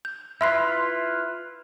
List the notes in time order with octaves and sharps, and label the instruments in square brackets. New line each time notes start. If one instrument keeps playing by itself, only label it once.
[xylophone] G6
[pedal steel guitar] E4 F4 B4 [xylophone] E5 C6 C7